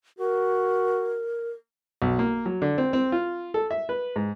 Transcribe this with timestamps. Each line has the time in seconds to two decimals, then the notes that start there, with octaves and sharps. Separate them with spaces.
0.19 F#4 A#4
2.02 B1
2.19 A#3
2.46 F#3
2.62 D3
2.78 C4
2.93 C4
3.12 F4
3.54 A4
3.71 E5
3.89 B4
4.16 G#2